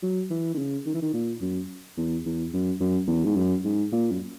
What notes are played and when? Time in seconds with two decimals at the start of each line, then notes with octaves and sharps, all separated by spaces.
0.02 F#3
0.30 E3
0.54 D#3
0.58 C#3
0.86 D#3
0.94 E3
1.02 D#3
1.13 A#2
1.41 F#2
1.97 E2
2.26 E2
2.53 F#2
2.80 F#2
3.08 E2
3.25 G#2
3.36 F#2
3.64 G#2
3.92 A#2
4.11 F#2